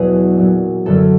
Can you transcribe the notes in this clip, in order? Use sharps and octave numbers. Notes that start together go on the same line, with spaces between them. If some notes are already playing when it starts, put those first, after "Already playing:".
Already playing: E2 B2 F#3 G#4
A#2 F#3
F#2 D3 F#3 A4